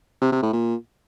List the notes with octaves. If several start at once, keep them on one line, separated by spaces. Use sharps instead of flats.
C3
C3
A2
A#2